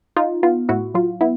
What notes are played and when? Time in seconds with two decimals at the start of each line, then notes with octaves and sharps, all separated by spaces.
0.17 D#4 F4
0.43 B3 F4
0.69 A2 E4 F#4
0.94 F#3 F4
1.21 B3 E4